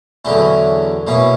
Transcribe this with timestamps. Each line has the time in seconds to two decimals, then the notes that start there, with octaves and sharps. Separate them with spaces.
0.25 E2 D3 F#3 C#4 E4
1.07 B2 A#3 C#4 E4